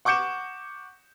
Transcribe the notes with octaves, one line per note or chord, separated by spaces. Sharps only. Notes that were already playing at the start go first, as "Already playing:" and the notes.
F#5 C#6 D6 G6 C#7 E7